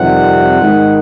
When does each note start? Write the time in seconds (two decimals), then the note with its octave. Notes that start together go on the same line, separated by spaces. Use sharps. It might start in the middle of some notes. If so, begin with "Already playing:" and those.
Already playing: F2 C3 D#3 G3 F#5
0.61 G#2 D#3 G#3